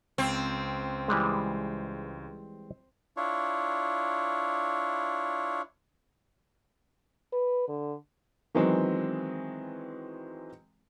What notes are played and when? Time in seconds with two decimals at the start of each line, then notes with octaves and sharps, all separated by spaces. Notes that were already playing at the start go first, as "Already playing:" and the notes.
0.18 C#2 C4
1.08 E3 G3 G#3
3.17 D4 E4 F4 C#5
7.33 B4
7.68 D3
8.55 D#3 E3 F#3 G#3 B3 C4